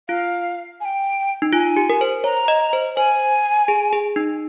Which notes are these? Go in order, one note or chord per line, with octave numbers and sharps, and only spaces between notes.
F4 F5
G#5
G5
D#4
F4 G#5
G4
A#4
C5
C#5 A#5
D#5
C5
C5 G#5
G#4
G#4
D#4